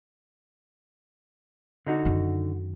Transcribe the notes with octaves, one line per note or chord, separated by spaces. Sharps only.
D3 D#4 F#4
F#2 D#3